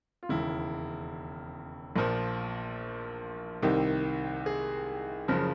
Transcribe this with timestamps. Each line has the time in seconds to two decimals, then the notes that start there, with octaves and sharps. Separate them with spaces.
0.23 F4
0.29 E1 D#2 C#3 E4
1.96 A#1 A#2 F3
3.62 C2 C3 D#3
4.46 G#4
5.28 F#1 C#3 F3